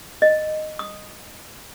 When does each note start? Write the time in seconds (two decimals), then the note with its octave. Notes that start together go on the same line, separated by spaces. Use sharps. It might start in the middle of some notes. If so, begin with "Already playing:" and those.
0.22 D#5
0.79 D#6